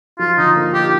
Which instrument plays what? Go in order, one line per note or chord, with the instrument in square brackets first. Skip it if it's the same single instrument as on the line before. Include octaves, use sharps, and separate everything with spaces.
[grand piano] F3 [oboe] F4
[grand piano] D3 [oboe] D#4
[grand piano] A#3
[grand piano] D#4 [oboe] G4